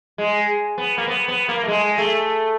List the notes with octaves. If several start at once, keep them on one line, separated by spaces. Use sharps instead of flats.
G#3
B3
A#3
B3
B3
A#3
A3
G#3
A3